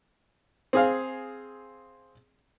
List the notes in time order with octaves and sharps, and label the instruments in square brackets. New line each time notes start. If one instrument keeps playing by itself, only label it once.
[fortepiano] C4 G#4 F5